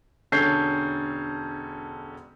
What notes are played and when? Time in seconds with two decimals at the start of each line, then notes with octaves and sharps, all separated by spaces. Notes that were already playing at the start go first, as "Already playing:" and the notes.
0.32 E1 D3 C#4 A4 G6 C7